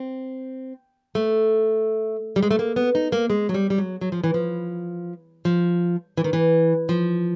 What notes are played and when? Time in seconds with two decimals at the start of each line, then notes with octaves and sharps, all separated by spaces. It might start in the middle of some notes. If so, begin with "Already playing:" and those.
Already playing: C4
1.15 A3
2.36 G3
2.43 G#3
2.51 A3
2.59 A#3
2.76 B3
2.95 D#4
3.12 A#3
3.30 G#3
3.49 F#3
3.54 G3
3.70 G3
3.78 F#3
4.01 F#3
4.12 F3
4.24 E3
4.34 F3
5.45 F3
6.17 E3
6.24 D#3
6.33 E3
6.89 F3